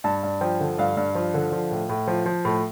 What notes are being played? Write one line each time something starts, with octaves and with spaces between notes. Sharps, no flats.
G2 A5
G2
F3 G5
D3
G2 F5
G2
F3
D3
F3
A2
A2
F3
F3
A2